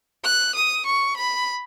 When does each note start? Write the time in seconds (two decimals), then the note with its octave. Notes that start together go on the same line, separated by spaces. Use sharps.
0.24 F#6
0.55 D#6
0.86 C#6
1.17 B5